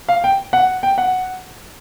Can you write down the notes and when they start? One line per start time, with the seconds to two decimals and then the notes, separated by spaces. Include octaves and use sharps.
0.08 F5
0.24 G5
0.53 F#5
0.83 G5
0.98 F#5